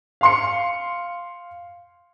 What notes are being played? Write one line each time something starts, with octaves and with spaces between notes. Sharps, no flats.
F5 C6 C#7